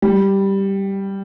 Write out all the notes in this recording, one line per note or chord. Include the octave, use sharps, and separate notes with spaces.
G3